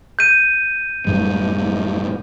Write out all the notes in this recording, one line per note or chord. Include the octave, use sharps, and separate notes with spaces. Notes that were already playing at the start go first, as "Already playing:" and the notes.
G6 D#7
F#2 A2 G3